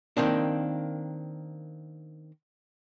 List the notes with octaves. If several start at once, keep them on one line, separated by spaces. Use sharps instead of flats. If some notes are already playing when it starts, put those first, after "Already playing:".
D#3 A#3 C4 D4